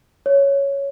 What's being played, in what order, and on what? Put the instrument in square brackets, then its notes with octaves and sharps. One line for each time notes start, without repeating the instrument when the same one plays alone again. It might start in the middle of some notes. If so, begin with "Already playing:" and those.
[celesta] C#5